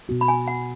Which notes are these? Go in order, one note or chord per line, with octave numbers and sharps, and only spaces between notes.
B2 B3 F#4
B5
G#5
F#5